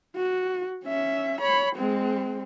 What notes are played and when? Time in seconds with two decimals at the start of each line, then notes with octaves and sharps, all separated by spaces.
0.16 F#4
0.85 C#4 E5
1.41 C#5 B5
1.76 G#3 C4